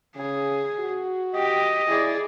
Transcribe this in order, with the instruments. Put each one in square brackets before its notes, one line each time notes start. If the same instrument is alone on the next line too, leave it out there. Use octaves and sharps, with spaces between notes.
[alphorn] C#3 [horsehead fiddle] G#4
[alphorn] F#4
[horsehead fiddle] G4 G5 [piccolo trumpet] D#5
[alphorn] E4 [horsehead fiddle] G#4 D5